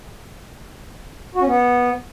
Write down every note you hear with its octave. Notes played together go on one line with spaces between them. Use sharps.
F#4
C#4
B3